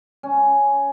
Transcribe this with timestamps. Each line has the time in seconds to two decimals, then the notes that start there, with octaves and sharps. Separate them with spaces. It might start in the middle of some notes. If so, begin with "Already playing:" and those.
0.23 C#4